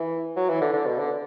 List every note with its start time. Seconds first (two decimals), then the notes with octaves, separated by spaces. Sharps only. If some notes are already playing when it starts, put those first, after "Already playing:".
Already playing: E3
0.36 F#3
0.49 E3
0.61 D3
0.73 D3
0.86 B2
0.99 D3